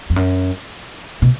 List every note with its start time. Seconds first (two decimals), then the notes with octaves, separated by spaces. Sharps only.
0.10 F2
0.16 F#2
1.22 B2